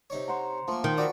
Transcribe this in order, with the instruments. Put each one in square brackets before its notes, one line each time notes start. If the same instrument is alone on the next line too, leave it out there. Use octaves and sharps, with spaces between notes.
[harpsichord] C3 D#4 C#5
[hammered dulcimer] C5 F#5 A#5
[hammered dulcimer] F3 [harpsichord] A3 A#3
[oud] D#3
[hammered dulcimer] F#4 [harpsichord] D5 B5 C#6